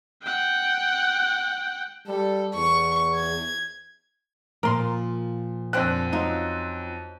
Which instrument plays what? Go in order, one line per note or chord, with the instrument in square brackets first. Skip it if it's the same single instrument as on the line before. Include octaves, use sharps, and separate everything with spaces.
[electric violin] F#5 G5
[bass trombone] G3 [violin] A4
[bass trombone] E2 [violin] C#6
[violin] G#6
[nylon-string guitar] A#2 F3 [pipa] A#4 C6
[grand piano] F2 F#6 [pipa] D3 C4 F4
[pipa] F#3 D#4 [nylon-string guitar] C#4 F4